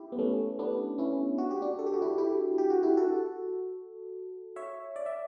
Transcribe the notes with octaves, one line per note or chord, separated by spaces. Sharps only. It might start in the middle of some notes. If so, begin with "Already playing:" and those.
Already playing: E4 G4
B3
A3 C#4
B3 D4
C#4 E4
F#4
G4
D4 F#4
A4
G4
F#4
E4 G4
E4 G4
G4
F#4
E4 G4
F#4 A4
C#5 E5
D5
E5